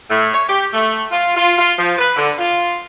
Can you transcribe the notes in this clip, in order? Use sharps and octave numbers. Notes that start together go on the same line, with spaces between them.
A2
C#5
G4
A3
F4
F4
F4
F3
B4
D3
F4